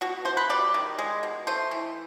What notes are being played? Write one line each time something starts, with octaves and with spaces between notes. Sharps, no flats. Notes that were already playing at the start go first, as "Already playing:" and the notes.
B2 F#4
B2 C5
B4
G3 D5
D#3
G#3
B2
A3 C5
E3